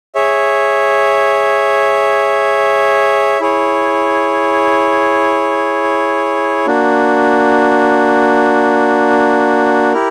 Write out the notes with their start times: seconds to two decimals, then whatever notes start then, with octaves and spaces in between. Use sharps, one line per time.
0.15 G#4 C#5 E5
3.40 E4 G#4 C#5
6.67 A#3 D4 F#4
9.93 E4 G4 A#4